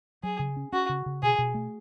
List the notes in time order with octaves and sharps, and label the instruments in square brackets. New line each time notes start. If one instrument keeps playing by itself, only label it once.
[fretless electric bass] F#3 [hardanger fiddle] G#4
[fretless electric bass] C#3
C#4
[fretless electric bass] C#4 [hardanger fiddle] F#4
[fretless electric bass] C#3
C#3
[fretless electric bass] B2 [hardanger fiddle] G#4
[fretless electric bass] B2
A3